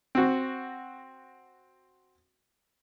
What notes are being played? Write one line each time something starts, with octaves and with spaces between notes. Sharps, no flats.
C4 F#4